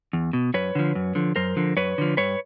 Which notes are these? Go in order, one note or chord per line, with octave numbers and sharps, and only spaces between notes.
E2
B2
F#2 B4 C#5
D3 F3
F#2
D3 F3
F#2 A#4 C5
D3 F3
F#2 B4 C#5
D3 F3
G2 B4 C#5